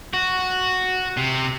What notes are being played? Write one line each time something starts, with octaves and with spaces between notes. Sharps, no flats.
F#4
C3